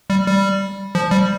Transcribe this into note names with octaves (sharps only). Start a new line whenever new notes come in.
G3
G3
F3
G3